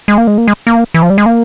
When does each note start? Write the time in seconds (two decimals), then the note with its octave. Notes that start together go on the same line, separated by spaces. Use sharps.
0.08 G#3
0.18 A#3
0.27 G#3
0.38 A#3
0.48 G#3
0.67 A#3
0.94 E3
1.02 F3
1.10 G3
1.18 G#3
1.26 A#3